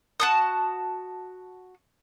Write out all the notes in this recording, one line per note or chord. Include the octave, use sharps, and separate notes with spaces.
F#4 A5 D#6